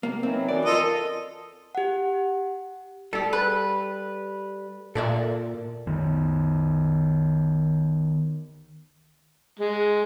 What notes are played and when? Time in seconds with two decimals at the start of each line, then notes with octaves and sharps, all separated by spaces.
0.03 C3 A#3
0.23 D#3 E3 F#3 C4
0.48 F#2 B2 E3 D5
0.65 A#3 F4 A4 D#5
1.75 G4 F#5
3.13 G3 G4 A4
3.33 B4
4.95 A#2 A4 D5 E5
5.87 D#3 B3
9.59 G#3